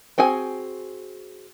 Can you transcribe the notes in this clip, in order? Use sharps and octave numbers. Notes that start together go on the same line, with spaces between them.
C4 F#4 G#4 G#5